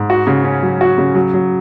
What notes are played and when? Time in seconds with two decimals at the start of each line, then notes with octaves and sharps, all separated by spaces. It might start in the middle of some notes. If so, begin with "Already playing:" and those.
Already playing: G#2
0.10 F#4
0.27 C#3
0.45 C#4
0.63 F#3
0.81 F#4
0.98 C#3
1.15 F#3
1.34 F#3